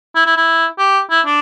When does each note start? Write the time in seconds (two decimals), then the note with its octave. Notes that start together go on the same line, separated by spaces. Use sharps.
0.16 E4
0.26 E4
0.37 E4
0.79 G4
1.10 E4
1.26 D4